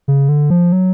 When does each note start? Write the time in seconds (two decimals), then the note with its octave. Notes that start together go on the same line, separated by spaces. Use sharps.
0.08 C#3
0.29 D3
0.50 F3
0.72 F#3